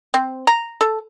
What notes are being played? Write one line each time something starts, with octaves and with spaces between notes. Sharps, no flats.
C4
A#5
A4